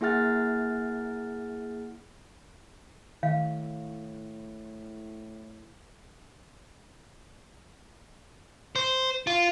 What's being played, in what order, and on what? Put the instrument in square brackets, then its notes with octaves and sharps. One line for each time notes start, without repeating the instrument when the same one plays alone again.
[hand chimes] A#3 E4 G#4 F#5 F6 A6
[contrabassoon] A2 [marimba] D#3 [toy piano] F5
[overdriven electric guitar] C5
F4